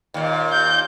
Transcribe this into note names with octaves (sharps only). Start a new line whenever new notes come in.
D#2 A#2
G6